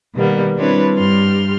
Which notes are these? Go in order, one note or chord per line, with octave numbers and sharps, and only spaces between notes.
B2 D#3 G3 A#3 B3
G3 C4 D4 E4 B4 C#5
G2 G4 C6 F6